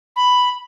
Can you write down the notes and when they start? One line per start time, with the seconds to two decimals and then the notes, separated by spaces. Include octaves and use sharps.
0.16 B5